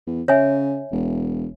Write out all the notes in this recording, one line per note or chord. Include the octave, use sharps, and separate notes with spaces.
E2
C#3 C#5 E5 G#5
E1